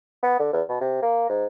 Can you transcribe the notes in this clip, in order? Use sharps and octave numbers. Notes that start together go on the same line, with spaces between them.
B3
D3
E2
B2
C3
A#3
G#2